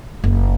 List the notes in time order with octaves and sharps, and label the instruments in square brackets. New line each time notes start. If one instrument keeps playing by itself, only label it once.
[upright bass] F#1